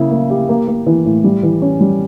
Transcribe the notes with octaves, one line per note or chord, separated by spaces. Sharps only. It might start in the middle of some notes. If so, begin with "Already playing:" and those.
Already playing: C#3 A#3 E4
A#3
G4
A#3
A#3
E3
A2
G3
E3
C#4
G3